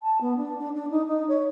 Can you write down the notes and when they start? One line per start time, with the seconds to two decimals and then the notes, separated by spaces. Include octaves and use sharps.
0.03 A5
0.21 B3
0.37 D4
0.58 D4
0.75 D4
0.91 D#4
1.06 D#4
1.28 C#5